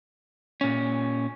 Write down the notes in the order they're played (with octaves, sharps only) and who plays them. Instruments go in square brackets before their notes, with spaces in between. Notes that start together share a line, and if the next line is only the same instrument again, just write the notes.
[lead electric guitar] A#2 C#4